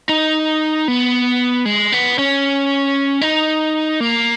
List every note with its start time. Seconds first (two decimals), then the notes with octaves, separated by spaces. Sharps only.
0.09 D#4
0.88 B3
1.65 G#3
1.92 B3
2.18 C#4
3.22 D#4
4.00 A#3